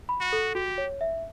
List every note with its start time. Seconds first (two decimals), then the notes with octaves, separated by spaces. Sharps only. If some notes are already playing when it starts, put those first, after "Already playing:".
0.09 B5
0.21 F#4
0.33 A4
0.55 F#4 G4
0.78 C#5
1.01 E5